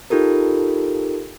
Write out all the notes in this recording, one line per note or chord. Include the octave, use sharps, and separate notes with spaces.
D#4 F4 G4 A4 A#4